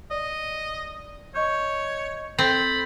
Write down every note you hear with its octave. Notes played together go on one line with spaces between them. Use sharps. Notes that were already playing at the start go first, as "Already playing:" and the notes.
D5 D#5
C#5 D#5 C#6 G6
C4 A4 B5 A6